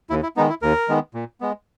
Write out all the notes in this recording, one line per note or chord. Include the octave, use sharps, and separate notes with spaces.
D#2 E4
E4
D#3 G#3 B3 D#4
E4
D#2 A#4
D#3 G#3 B3
A#2
G#3 B3